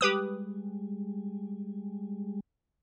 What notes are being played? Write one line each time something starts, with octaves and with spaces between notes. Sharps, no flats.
G3 G#3 G4 B4 D#6